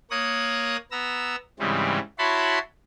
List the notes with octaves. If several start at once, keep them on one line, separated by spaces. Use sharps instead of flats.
A#3 C#5 A#5 D#6 F#6
B3 A#5 E6
G#2 C#3 E3 G3 C4
E4 F#4 C#5 A5 B5 C6